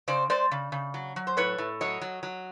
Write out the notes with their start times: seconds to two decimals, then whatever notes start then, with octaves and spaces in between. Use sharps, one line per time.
0.08 C#3 C5 D5
0.30 G#3 C5 D5
0.51 C#3
0.72 C#3
0.94 F#3
1.16 F#3
1.27 C5
1.37 A2 B4 C#5
1.58 A2
1.81 F#3 C#5 D#5
2.01 F#3
2.23 F#3